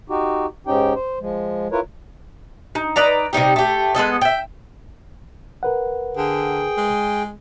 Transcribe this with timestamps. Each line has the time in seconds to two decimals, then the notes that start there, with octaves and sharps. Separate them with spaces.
0.09 D#4 F#4 G4
0.67 G#2 C#4 D#4 G4 G5
0.95 C5
1.21 F3 G#3
1.72 E4 F4 A#4 B4 C#5
2.75 D#4
2.96 D#4 B4 D5 A#5
3.33 C3 G3 D#4 G4
3.56 A3 G4
3.95 G#3 B3 A4 D#5
4.22 E5 G5
5.63 A#4 B4 F#5
6.17 D3 G#4 G5
6.77 G#3